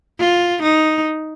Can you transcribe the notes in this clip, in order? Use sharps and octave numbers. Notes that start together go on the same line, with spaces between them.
F4
D#4